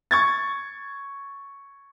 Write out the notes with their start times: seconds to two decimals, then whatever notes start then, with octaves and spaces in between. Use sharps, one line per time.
0.11 C#6 G#6 A6